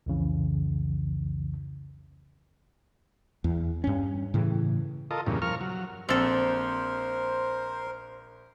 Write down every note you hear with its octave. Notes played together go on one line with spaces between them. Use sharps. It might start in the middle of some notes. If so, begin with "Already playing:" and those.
C2 F2 C#3 E3
E2
G2 C#4
A2 C#3 E3
F4 A4 A#4 D#5
E2 G2 A#2 C#3
F3 A#4 C#6 F6
F#3
A#1 C4 A4 A#4 C5